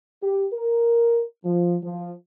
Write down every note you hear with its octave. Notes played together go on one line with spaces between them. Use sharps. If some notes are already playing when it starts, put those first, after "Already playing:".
G4
A#4
F3
F3